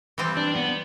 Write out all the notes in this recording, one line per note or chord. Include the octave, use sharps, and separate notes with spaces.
E3 G3 C4
D4
B3